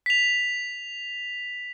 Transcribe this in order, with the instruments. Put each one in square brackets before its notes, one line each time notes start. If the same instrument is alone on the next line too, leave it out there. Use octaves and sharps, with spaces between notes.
[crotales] B6 F7